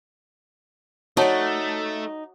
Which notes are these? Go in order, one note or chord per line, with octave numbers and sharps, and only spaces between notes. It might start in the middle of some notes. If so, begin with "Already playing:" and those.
A3 D#4 F#4 C#5 D5 A5 C#6